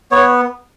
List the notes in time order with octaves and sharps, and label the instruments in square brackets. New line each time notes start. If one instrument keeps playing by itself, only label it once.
[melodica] B3 C#5